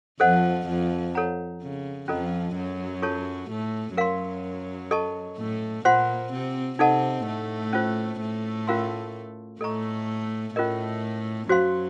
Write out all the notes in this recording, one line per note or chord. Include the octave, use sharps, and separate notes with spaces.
F2 F3 A4 C5 D#5 F#5
F2 F3
A4 C#5 F#5 A#5
C#3
F2 F3 C#4 F4 A4 D#5 A#5
F#2 F#3
F4 A4 C#5 A5 C#6
A2 A3
F#2 F#3 A#4 F5 C6
A4 D#5 A5 C#6
A2 A3
A#2 A#3 F4 C5 F#5 C6
C3 C4
C3 C4 D#4 A4 D#5 F#5 A5
A2 A3
C#4 F4 C5
A2 A3
C#4 F4 A#4 F5 C6
A2 A3 A4 D#5 A#5 C#6
A2 A3 C#4 F4 A#4 D#5
F#2 F#3 F#4 C5 F5 C6